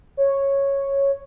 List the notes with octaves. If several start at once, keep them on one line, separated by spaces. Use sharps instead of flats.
C#5